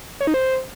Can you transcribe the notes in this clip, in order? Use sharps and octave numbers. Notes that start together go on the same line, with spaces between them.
C#5
D#4
C5